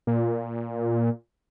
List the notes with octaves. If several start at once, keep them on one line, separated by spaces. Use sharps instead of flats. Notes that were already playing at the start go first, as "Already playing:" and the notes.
A#2